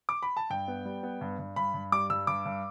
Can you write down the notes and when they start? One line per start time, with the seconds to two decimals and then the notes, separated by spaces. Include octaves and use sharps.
0.09 D6
0.23 B5
0.37 A5
0.50 G2 G5
0.68 B3
0.85 G3
1.03 B3
1.21 G2
1.39 G2
1.56 G2 B5
1.74 G2
1.92 G3 D6
2.10 G2 E6
2.27 G2 D6
2.46 G2